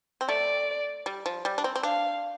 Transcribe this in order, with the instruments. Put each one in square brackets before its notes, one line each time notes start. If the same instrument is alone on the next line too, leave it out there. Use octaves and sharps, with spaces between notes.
[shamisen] C4
[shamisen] A3 [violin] D5
[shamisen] G3
F3
G3
D4
C4
C4
[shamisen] D4 [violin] F5